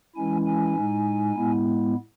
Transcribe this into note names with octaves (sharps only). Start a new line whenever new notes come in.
E3 G#3 C#4 E4 G#5
G#5
A2 G#3 D#4
A2 G#3 B3 E4